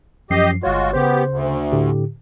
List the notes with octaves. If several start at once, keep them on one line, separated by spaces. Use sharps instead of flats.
F#2 F3 G4 D#5 C7
G1 G#3 F4 F#4 C#5
C#3 B3 G4 C5
D2
A2 D3 G4